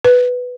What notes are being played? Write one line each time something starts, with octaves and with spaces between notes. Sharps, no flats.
B4